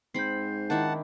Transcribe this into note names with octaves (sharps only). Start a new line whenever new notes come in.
G#2 C4 B5 G6 C7
D#3 D4 E4 F#5 A5